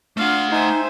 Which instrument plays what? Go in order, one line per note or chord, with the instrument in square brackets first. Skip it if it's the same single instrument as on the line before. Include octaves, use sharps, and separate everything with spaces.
[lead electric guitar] A3 F#5 [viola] D4 [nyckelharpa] F4 F5
[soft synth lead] D#4 [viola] C5 E5 [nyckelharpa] G5 G#5